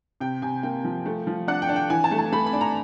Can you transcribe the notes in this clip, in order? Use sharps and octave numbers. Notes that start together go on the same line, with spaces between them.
C3 G5
C3 G#5
A#3 G5
F3
A3
F3
D4 F#5
G5
D4
G5
E3 G#5
A5
A3
A5
A3 B5
B5
D4
A#5